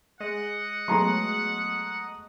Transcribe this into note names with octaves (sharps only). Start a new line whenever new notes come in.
G#3 D#5 F#5
F#3 G#3 A3 B3 A#5 C6